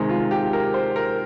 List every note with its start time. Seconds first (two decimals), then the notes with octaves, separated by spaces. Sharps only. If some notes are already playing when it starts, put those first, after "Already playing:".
Already playing: C3 D#3 G#3
0.09 F4
0.31 G4
0.53 A#4
0.74 C5
0.96 A#4